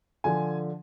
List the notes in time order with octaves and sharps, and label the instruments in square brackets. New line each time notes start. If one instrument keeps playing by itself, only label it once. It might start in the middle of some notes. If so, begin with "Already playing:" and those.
[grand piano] D3 F3 G#5